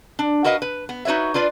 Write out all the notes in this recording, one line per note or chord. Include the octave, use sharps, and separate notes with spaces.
D4
F#4 A#4 B4 D#5 F5
B4
B3
D#4 F#4 B4 C#5 E5
D4 F4 B4 D5